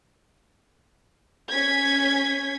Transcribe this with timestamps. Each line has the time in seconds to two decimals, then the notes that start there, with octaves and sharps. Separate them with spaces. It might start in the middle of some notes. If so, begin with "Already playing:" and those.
1.49 C#4 G#6 B6